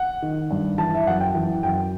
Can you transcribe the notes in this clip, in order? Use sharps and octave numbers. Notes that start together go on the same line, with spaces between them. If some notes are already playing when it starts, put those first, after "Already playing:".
Already playing: F#5
D#3
G2
E3 A5
E5
F#2 F#5
G5
E3
F#2 G5